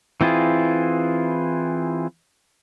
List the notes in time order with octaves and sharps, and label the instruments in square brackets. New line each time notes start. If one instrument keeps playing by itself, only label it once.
[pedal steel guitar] E3 C4 E4 F4 G#4